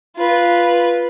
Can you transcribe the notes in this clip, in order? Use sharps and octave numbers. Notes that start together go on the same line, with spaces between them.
F4 B4